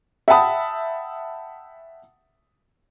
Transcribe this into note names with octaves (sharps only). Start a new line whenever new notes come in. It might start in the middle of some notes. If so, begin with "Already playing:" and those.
E5 F#5 G5 A5 B5 D#6